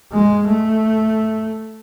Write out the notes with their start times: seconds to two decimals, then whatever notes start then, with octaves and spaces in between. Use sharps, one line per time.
0.13 G#3
0.48 A3